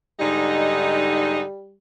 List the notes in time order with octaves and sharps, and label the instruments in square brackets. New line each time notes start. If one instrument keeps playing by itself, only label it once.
[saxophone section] G#2 D3 D#4 [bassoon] G3